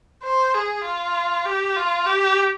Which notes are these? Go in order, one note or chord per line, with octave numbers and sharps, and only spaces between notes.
C5
G#4
F4
G4
F4
G4